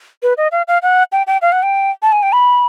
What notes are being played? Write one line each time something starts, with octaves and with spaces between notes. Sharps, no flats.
B4
D#5
F5
F5
F#5
G5
G5
F5
F#5
G5
A5
G#5
G5
B5